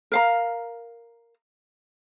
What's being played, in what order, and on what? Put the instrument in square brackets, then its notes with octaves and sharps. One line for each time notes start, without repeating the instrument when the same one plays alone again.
[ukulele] A#4 F5 A#5